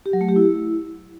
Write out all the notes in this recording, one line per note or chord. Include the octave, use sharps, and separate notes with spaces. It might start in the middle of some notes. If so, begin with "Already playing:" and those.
G4
F#3
A3
G4
E4